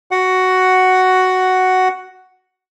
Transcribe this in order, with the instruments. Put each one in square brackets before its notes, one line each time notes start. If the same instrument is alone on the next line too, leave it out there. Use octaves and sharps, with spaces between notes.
[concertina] F#4 F#5